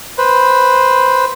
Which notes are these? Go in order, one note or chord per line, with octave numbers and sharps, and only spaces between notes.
B4 C5